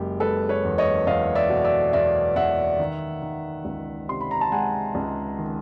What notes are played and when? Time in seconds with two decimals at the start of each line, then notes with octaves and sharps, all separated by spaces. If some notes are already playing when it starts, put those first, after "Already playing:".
Already playing: F#1 G#3 G4
0.20 G#3 A4 B4
0.49 B4 C#5
0.64 E2
0.78 C#5 D#5
1.07 E2 D#5 F5
1.35 D5 E5
1.49 B2
1.64 D5 E5
1.93 E2 D5 E5
2.36 E2 E5 F#5
2.79 D#3
3.22 D#3
3.65 C#2
4.08 C3 C6
4.21 B5
4.31 A#5
4.41 A5
4.52 G#3 F#5 G#5
4.95 C#2
5.39 D#3